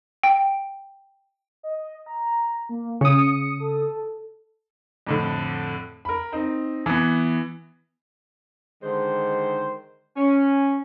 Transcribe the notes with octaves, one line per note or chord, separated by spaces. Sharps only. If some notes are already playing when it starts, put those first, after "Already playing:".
G5
D#5
A#5
A#3
C#3 D#6 C#7
A4
F2 A2 D3
A#4 B5
C4 D#4
E3 B3
D3 D#3 G#3 C5
C#4